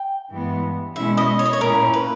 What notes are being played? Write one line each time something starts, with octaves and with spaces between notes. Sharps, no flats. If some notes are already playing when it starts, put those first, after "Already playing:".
Already playing: G5
G2 E3 G#3 B3
B2 G#3 C#4 E4 E5
D#5
C#5
D#5
C#5
A#2 A#3 C#4 E4 A#4
B4